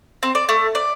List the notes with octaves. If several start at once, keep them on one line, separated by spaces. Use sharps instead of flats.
C4
D5
A3
D5